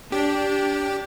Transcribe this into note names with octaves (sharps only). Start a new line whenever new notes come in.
D4 G4